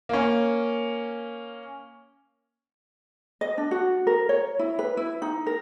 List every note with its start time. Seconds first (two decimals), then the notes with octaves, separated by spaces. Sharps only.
0.09 A#3 C#4
3.41 D#5
3.58 D4
3.71 F#4
4.07 A#4
4.29 C#5
4.59 E4
4.79 B4
4.97 E4
5.22 D#4
5.46 A#4